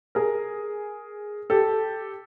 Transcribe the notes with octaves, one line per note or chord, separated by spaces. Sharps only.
G#4 A#4
G4 A4